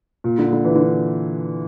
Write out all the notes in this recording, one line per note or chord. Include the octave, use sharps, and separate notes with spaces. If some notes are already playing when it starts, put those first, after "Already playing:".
A#2
D3
D3
E3
D3